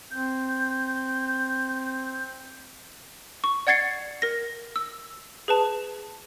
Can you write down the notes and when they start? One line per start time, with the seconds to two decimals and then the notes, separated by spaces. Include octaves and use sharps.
0.10 C4 G6
3.44 C#6
3.67 D5 F#5 G#6 A6 C7 C#7
4.22 A#4 A#6
4.76 E6
5.48 G#4 B4 A5